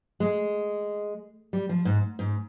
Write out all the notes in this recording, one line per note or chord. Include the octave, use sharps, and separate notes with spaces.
G#3
G3
F3
G#2
G#2